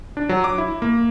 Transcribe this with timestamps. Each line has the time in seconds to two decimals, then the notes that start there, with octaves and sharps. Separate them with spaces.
0.17 D4
0.29 F#3
0.44 D6
0.58 E4
0.82 A#3